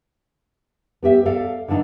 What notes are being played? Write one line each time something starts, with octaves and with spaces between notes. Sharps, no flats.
B3 G4 E5
A4 D5 F5
D3 E3 D4 D#4 F5